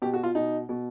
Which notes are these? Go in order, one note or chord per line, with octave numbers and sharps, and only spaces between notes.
B2 G4
F#4
F4
B2 D#4
B2